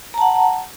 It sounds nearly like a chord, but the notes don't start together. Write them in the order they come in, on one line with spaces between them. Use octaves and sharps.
A#5 A5 F#5